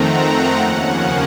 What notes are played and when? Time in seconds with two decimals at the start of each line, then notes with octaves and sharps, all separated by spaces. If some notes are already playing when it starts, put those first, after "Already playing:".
Already playing: F2 D#3 A3 C4 F#5 A#5
0.21 F#5
0.57 D#2 C#3 F3 A#3 C#4 F#5